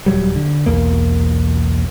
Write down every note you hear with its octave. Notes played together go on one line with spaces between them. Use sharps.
D#1 F#3 G3
D3
B1 E2 A#3